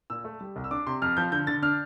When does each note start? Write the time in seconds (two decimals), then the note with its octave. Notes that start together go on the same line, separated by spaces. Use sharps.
0.10 A#2 E6
0.24 A3
0.41 G3
0.56 C2
0.64 E6
0.71 D4 D6
0.87 C3 C6
1.02 F2 F6
1.17 F3 G6
1.32 D3 G6
1.47 D3 A6
1.62 D4 F6